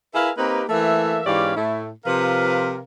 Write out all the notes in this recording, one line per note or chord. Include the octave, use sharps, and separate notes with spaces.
E4 G#4 A#4 B4 E5 F5
A#3 C4 D#4 G4 B4
E3 A3 A#3 A4 E5
G#2 E3 C#4 G4 D5 F5
A2 A3 E4
C3 F3 A#4 B4 F5